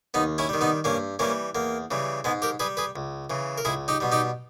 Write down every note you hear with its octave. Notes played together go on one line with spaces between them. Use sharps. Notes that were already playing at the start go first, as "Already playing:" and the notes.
D#2 B3 D#4
C#4 E4
D#3 G3
B3 D#4
G2 A#3 C#4
E3 G3 A#3 C#4
E2 A#3
C#3 E3 G3
G#2 G#3 B3
G4 A#4
G3 G#4 B4
G#4 B4
C#2
C#3 E3
A#4
C#2 E4 G#4
D#4 G4
B2 G3
D#4 G4